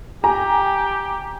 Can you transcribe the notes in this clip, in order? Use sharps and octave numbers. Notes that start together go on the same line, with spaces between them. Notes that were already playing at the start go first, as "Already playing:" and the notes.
G4 G#5 A#5